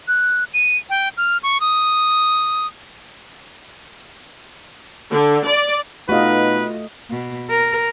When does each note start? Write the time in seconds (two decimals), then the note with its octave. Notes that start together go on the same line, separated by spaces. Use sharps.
0.08 F#6
0.54 D#7
0.90 G5
1.17 F6
1.43 C#6
1.60 D#6
5.11 D3
5.46 D5
6.09 B2 A3 D#4 F4 F#4 B4 D#5
7.10 B2
7.50 A#4